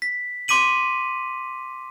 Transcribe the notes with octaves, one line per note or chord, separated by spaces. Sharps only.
B6
C6 D6 B6 D#7 F#7